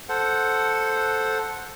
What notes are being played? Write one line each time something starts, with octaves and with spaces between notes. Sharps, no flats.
A4 C5 F#5